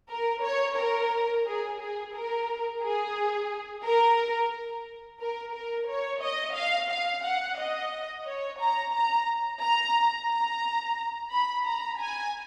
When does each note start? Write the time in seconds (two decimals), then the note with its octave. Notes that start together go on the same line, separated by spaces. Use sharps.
0.10 A#4
0.44 C#5
0.78 A#4
1.46 G#4
1.81 G#4
2.14 A#4
2.83 G#4
3.85 A#4
5.21 A#4
5.54 A#4
5.88 C#5
6.23 D#5
6.56 F5
6.91 F5
7.25 F#5
7.59 D#5
8.26 C#5
8.60 A#5
8.94 A#5
9.62 A#5
10.30 A#5
11.32 B5
11.67 A#5
12.00 G#5